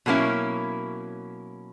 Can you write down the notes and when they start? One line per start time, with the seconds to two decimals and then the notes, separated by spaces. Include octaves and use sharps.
0.06 B2 F#3 A#3 C#4 E4